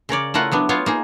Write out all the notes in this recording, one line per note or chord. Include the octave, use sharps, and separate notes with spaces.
C#3 A#4 C#5 D5
A3 E4 F4 A#4 F#5
F#3 B3 D4
B3 F4 C#5
A#3 D#4 G#4